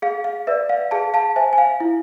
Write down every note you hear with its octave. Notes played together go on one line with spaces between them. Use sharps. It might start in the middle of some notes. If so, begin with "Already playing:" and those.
G#4 F5
F5
B4 D5 E5
F5
G#4 F5 A5
F5 A5
C5 E5 G#5
G#5
F5
E4